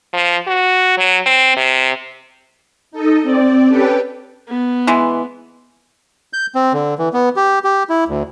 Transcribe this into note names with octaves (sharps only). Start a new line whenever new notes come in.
F3
F#4
F#3
C4
C3
D#4 A4 D#5
C4 D5
C#4 G4 A4 B4 G5
B3
E3 G#3
G6
C4
D3
E3
B3
G4
G4
E4
D2